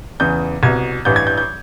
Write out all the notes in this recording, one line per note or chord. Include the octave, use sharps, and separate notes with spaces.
E2 C#3 E3 G6
C2 B2 G#6
A1 G2 E3 G6
G#6
G6
G6